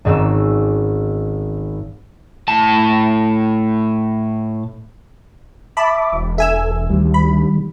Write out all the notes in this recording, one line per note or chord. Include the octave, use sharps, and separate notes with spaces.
G#1 G#2 C4 C#4 E6
A2 A5
E5 A5 B5 D6
E1
A4 E5 G#5 E6
D2 D#3 G3
B5